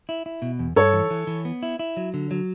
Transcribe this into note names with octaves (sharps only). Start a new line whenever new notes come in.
E4
E4
B2
E2
G2 A4 C#5
E3
E3
E3
B3
E4
E4
F#3
D3
F#3